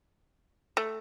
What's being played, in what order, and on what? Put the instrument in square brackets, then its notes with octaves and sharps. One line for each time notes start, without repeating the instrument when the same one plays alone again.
[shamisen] A3